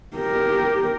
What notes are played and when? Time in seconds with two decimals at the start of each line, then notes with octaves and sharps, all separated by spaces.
0.16 G4 A#4